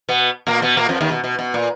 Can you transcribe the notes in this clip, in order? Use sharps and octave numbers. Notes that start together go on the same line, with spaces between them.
B2 B3
A#2 A#3
B2 B3
A#2 A#3
F2 F3
D#2 D#3
B2
B2
B2
A#2